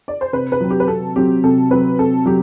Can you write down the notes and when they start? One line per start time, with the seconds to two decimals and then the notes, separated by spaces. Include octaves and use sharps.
0.08 D5
0.21 C5
0.33 C3 B4
0.52 B4
0.60 F#3 C4
0.70 G4
0.80 B4
0.88 C3 A4
1.16 F#3 C4 G4
1.44 C3 A4
1.71 F#3 C4 B4
1.98 C3 A4
2.26 F#3 G4